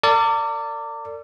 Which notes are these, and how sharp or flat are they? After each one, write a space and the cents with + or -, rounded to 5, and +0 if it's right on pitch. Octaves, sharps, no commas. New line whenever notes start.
A#4 -45 D5 -10